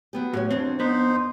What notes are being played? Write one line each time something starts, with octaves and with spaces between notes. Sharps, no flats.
F#3 B3 G4
A2 F#4 G4 C#5
F2 C4 D4 C#5
B3 D#4 C5